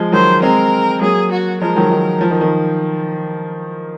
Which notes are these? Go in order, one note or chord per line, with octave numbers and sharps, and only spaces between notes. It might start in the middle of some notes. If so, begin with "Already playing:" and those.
Already playing: F3 G#3
D#3 F#3 C5
G#3 C4 A#4
F#3 A#3 G#4
F#4
F3 G#3 A#4
D#3 F#3
D#3
F3
D#3
D#3